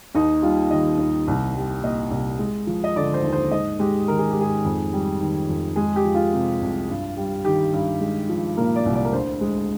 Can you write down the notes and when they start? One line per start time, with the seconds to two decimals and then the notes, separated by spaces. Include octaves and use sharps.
0.15 D#2 D#4
0.42 G3 F4
0.71 D#3 D#5
0.98 D#2
1.28 C2
1.56 G3
1.83 A#2 D#5
2.11 C2
2.39 G#3
2.67 F3
2.84 D#5
2.96 D3 D5
3.14 C5
3.23 D#2
3.32 C5
3.51 G#2 D#5
3.79 G#3 G4
4.08 D#3 A#4
4.18 G#4
4.31 G4
4.37 G#2 G#4
4.64 F2
4.92 G3
5.21 D#3
5.48 F2
5.76 G#3 G#4
5.96 G4
6.05 F3
6.14 F4
6.33 C3
6.61 C2
6.89 G2
7.17 G3
7.44 D#3 G4
7.73 G2
8.01 G#3
8.29 F3
8.57 A#2 A#4
8.76 D5
8.86 C2
8.95 D5
9.05 A#4
9.13 D2 C5
9.41 G#3